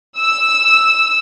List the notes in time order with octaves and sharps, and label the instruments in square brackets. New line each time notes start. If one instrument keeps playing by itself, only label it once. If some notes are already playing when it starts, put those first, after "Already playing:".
[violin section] E6